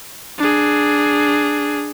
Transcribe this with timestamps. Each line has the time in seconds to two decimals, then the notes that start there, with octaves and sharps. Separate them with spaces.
0.38 D4 G#4